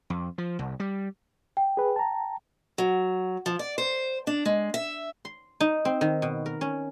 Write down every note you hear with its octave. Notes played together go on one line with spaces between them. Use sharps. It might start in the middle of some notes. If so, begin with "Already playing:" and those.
F2
F3
C2
G3
G5
G#4 B4
A5 A#5
F#3
F3
D5
C5
D4
G#3
E5
C6
D#4
C4
D#3
B2
A#4
C#4